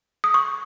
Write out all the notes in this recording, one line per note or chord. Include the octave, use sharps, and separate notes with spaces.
D#6
C#6